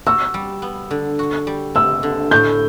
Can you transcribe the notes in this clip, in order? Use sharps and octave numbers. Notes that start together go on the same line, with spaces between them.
F#4 E6
G3
B3
D3
F#4
G3
B3 E6
D3
A2 G6